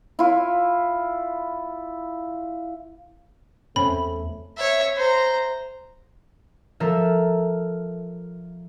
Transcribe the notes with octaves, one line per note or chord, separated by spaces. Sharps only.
E4 F4
E2 A3 C4 C#4 B5
C#5 E5
C5 A#5
F3 A4 A#4 E5